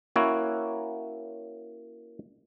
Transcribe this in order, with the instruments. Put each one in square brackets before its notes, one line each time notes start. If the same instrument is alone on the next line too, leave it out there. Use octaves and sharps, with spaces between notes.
[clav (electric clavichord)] A#3 C#4 E4 F#4 C#5